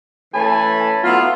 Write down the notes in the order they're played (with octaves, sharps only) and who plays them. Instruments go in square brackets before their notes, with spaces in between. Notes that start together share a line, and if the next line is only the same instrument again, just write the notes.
[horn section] E3 A3 C#4 G#5 A5 B5
F#3 B3 E4 F4